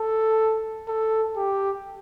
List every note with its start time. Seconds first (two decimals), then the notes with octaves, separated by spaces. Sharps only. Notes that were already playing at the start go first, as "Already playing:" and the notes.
Already playing: A4
0.88 A4
1.37 G4